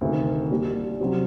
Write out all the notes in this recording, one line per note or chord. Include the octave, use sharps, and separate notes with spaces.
D2 C3 D#3
A#2 G3 D4 G4
C3 F#3 C4 G4